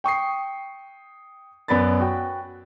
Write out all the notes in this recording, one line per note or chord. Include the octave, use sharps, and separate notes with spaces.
G5 C#6 D#6 C7
F#2 B3 D5 B5 A6
F#4 G5